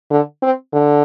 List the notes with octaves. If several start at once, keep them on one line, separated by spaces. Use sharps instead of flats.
D3
C4
D3